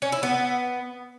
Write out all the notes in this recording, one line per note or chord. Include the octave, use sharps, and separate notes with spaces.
C#4
E4
B3